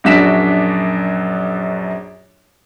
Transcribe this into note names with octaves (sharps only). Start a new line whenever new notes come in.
A#1 F#2 D4 F#4 B6 E7